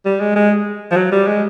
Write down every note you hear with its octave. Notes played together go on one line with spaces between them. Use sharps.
G3
G#3
G#3
F3
F#3
G3
G#3